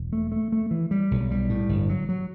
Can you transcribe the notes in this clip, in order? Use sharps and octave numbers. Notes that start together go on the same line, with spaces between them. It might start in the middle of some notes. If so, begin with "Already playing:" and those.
Already playing: E1
A3
A3
A3
E3
G3
B1
G3
A2
G1
F#3
F#3